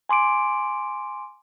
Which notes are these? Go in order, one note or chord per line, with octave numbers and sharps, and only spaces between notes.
G#5 C6 D6 D7